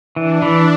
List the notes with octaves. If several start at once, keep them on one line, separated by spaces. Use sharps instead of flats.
E3 D4
E3